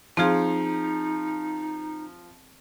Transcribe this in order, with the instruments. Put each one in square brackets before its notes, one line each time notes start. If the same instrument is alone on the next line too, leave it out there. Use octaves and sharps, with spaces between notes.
[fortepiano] F3 F5 [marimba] C4 G#4 [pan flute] D#4